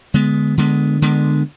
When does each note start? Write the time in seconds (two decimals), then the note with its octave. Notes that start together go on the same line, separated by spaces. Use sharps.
0.14 D3 G#3 B3
0.58 D3 G#3 B3
1.02 D3 G#3 B3